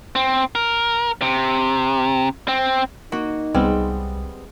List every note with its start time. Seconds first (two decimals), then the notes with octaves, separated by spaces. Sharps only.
0.16 C4
0.55 A#4
1.22 C3
2.48 C4
3.12 A#3 D#4 F#4
3.54 C2 G3 G#3 B3 C4